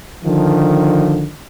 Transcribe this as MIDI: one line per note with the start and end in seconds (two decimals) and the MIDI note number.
0.24 1.29 50
0.24 1.29 51
0.24 1.29 53